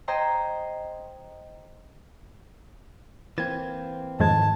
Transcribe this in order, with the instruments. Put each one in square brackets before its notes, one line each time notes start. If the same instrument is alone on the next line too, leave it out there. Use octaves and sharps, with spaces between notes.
[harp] C5 D#5 G5 G#5 A#5 C6
[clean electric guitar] E3 A#3 C4 [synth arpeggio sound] G#6
[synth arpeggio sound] F2 F3 G#3 [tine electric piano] G#2 D#3 G#6 [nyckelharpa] A5